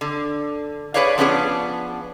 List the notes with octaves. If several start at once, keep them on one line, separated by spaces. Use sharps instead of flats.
D3
G#4 A4 B4 C#5 D5 F5
F3 B3 C#4 D4 E4 G#4